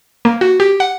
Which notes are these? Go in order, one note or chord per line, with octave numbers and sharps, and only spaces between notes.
A#3
F#4
G4
F#5